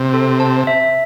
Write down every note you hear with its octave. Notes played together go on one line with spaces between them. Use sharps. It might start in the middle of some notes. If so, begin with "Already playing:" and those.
Already playing: C3
A4
A5
E5